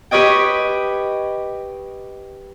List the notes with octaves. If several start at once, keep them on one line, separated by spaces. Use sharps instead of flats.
G4 B4 C#5 D#5 G5